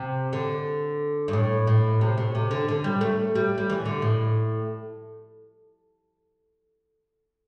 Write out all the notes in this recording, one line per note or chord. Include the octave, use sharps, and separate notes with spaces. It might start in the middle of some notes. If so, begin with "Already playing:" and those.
Already playing: C3
D3
G2
A2
A2
C3
A2
C3
D3
D3
G3
A3
G3
G3
E3
D3
A2